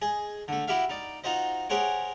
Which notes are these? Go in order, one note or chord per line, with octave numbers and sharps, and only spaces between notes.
G#4 D#5
D3 A3
E4 F#4 G4 E5 F5
D#4 D5
D#4 F4 F#4 C5 D#5
G4 G#4 A#4 C5 C#5 F#5